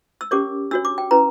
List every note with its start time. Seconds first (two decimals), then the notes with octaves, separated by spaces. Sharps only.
0.21 E6
0.31 C#4 G4 A#4 C#5 D6
0.71 D4 F#4 C#5 E6
0.85 D6
0.98 G5
1.11 C#4 E4 B4 A#5